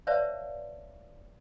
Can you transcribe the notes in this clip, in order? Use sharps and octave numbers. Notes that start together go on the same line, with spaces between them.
B4 C#5 D5 E5 F5 A5